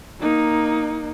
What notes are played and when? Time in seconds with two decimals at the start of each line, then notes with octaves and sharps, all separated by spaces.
0.20 A#3 D#4